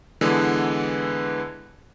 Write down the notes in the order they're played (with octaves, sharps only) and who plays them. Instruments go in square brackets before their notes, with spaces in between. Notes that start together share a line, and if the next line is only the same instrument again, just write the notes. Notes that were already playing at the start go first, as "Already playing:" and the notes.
[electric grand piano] D3 E3 G#3 B3